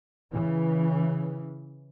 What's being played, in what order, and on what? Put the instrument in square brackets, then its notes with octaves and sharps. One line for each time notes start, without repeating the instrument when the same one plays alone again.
[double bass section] C#3 E3